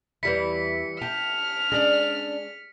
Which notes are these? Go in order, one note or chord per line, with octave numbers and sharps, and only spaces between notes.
E2 E3 G3 E4 B6 C#7
G4 A5 F6
G#3 C#4 D4 D5